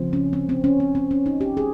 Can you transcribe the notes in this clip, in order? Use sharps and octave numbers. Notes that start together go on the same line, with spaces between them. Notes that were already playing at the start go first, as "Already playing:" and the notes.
Already playing: C#3 F3 C4
C#4
C4
C4
C#4
C4
C4
C#4
D#4
G4
G#4